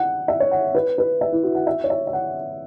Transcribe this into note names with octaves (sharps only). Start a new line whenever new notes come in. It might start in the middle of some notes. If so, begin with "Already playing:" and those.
Already playing: F#5
E5
C#5
F#5
B4
B4
E5
E4
F#4
F#5
E5
C#5
E5
E5
F#5